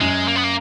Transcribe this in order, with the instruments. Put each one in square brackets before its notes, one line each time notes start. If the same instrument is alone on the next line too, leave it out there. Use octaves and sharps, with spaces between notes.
[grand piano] F#2 [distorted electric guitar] G#3
[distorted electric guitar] A#3
B3
A#3